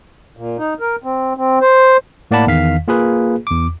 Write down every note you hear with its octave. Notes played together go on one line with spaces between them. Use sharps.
A#2
D#4
A#4
C4
C4
C5
A2 A#3 D5 F#5 A5 B5
E2 D#3 F5 B6
A#3 F4 G#4 B4
E2 D6